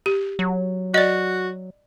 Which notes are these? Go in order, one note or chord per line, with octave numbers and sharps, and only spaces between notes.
G4
F#3
F#4 D5 D#5